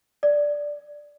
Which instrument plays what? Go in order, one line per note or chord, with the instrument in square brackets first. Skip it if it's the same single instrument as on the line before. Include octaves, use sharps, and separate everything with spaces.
[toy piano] D5